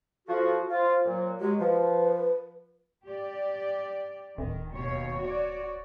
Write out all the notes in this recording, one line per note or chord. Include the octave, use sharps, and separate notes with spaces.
F3 F#4 A4
F4 C5
A#2 F#3
F#3 G#3 G4
F3 B4
G4 D5
D1 D#3
D#2 B2 C#5
F#4 C#5 D5